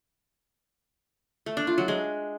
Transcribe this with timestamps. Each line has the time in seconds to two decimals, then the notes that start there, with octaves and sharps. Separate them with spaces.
1.46 A3
1.57 D4
1.67 F4
1.78 F#3
1.88 G#3